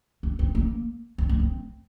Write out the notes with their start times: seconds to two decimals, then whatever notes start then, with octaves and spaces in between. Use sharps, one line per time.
0.23 A#3
0.39 C4
0.55 A#3
1.18 C4
1.29 A#3
1.40 C4